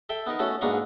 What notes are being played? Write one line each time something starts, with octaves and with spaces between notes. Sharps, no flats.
A4 E5 G5
B3 D#4 A#4
A3 C#4 F#4 A4
G#2 A#3 B3 D4 A#5 C#6